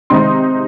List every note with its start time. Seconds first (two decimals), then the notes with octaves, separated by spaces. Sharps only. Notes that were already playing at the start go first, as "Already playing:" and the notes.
0.10 C3 D#3 G#3 C4 D#4 C6